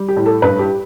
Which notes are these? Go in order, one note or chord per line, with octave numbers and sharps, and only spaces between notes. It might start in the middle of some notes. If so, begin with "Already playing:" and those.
Already playing: G3
G4
A2
A4
G2 B4
G4